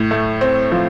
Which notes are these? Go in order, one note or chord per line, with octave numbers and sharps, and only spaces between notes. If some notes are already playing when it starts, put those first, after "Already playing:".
Already playing: A2
A3
C4
F3